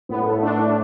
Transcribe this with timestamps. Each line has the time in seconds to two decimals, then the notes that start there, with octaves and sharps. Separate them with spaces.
0.09 A2 B3
0.26 A3
0.43 A3 D4
0.59 A2